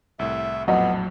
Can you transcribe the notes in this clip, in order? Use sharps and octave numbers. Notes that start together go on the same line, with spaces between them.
C2 A2 E5
A#1 F2 A2 F#3 B3 D#5